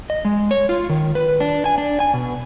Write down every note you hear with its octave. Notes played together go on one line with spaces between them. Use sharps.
D#5
G#3
C#5
F4
D#3
B4
D4
G#5
D4
G#5
B2